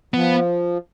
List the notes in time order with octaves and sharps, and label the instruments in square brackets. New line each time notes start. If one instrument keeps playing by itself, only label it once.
[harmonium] F3 [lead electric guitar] B3